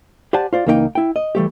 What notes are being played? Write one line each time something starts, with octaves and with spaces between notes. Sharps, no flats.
G4 C5 D5 F#5 G#5 A5
F4 C5 D5
C#2 E3 A#3 D#4 D#5 G5
E4 G5
D#5
E3 G3 A3 G4